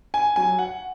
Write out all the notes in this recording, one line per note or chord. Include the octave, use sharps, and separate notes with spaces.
G#5
F#3 G#5
F#5